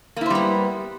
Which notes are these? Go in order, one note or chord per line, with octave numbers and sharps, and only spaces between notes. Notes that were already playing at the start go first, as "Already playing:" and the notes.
G3 A#3 B3 E4 C5